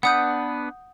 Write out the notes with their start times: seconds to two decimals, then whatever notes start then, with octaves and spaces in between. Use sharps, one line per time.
0.03 B3 D4 B4 F#5 D#6 G6